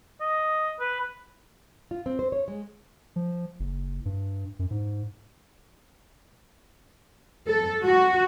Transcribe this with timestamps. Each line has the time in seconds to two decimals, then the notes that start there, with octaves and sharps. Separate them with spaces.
0.21 D#5
0.80 B4
1.91 F4
2.06 C4
2.19 C5
2.32 C#5
2.48 G#3
3.16 F3
3.60 F#1
4.05 G2
4.59 F#2
4.71 G#2
7.48 A4
7.83 F#4